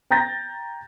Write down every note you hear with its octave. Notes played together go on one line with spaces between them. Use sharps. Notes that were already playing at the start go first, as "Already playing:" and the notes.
G5 A#5 G6 A6 A#6